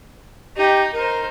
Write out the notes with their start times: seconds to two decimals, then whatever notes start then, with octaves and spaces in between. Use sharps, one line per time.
0.57 D#4 G4
0.93 D#4 A#4 C5